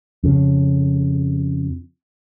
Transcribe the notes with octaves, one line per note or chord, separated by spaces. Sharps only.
F2 C#3